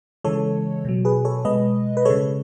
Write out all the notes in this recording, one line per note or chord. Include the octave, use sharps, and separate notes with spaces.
C#3 E3 G#3 A4 C#5
B2 F#3
G#4 B4
A4 C#5
B2 G#3 B4 D#5
B4
C#3 G#3 A4 C#5